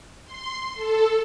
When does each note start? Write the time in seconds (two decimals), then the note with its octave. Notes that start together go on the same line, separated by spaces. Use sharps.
0.25 C6
0.75 A4